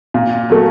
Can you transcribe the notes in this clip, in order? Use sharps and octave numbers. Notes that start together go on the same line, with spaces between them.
A#2
F#3 A3